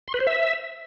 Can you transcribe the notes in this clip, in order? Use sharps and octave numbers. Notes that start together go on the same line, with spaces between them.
C6
B4
C5
E5